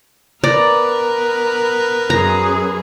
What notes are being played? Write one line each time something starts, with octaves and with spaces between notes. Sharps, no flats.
B3 A#4 B4 D5 A#5
F#2 G#4 A#5